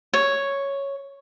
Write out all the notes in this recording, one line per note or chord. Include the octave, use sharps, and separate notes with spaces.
C#5